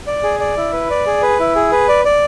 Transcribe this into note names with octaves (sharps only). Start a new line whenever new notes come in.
D5
G#4
D5
E4
B4
D5
G#4
B4
E4
G#4
B4
D5
D5